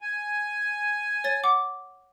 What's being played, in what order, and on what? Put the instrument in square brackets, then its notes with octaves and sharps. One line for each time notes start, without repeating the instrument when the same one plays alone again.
[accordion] G#5
[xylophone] C#5 A6
F#5 D6